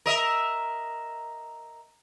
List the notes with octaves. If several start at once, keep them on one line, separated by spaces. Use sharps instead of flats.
A#4 D#5 E5